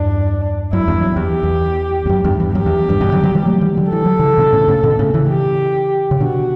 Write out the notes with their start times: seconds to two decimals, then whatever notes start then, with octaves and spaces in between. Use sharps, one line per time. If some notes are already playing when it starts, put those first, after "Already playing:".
Already playing: E2 G2 D4
0.72 F#2 E4
0.88 E2 G2
1.03 F#2
1.16 E2 G4
1.43 E2
2.06 E2
2.09 F#2
2.24 E2 G2
2.40 E2 G2
2.55 F#2 G4
2.66 E2
2.89 E2 G2
3.01 G2 B2
3.12 D3 F#3
3.23 D3 F#3
3.35 E3 G3
3.46 F#3 A3
3.61 E3 G3
3.77 D3 F#3
3.92 E3 A4
4.06 F#3
4.19 C#3 E3
4.38 B2 D3
4.53 A2 C#3
4.68 A2 C#3
4.84 B2 D3
4.99 A2 C#3
5.14 C#3 E3
5.30 G4
6.11 C#3
6.20 B2 D3 F#4